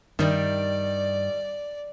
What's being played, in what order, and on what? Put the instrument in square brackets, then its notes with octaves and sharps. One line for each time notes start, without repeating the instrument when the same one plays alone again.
[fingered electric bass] G2 [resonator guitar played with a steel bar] D#3 G3 [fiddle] D5